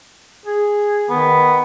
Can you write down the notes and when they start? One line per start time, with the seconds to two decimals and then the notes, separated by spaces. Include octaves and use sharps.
0.46 G#4
1.10 D#3 B3